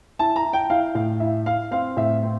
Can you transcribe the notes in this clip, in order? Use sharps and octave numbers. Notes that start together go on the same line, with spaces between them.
E4 A5
A#5
E4
G5
E4 F5
A2 F5
E4 E5
E4 F5
C4 F5
A2 E5
C4